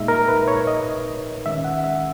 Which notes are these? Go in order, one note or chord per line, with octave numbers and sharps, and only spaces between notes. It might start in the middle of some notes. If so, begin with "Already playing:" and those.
Already playing: A#2 G#3 D#4 E5
A#4
B4
C#5
D#5
D#3 G#3 C#4 E5
F#5
E5